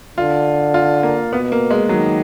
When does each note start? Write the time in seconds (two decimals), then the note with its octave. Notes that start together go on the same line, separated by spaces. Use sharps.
0.17 D3 F4
0.74 F4
1.03 A#3
1.33 B2 B3
1.52 A#3
1.70 G#3
1.89 D#3 F#3